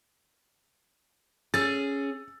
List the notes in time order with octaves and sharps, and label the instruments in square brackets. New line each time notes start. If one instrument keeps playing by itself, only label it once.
[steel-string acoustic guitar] C#4 G#4 [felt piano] E6 A6